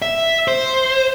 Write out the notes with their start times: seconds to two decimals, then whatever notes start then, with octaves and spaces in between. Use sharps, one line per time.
0.02 E5
0.48 C5